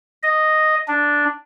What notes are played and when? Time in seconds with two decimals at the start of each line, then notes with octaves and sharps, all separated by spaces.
0.23 D#5
0.88 D4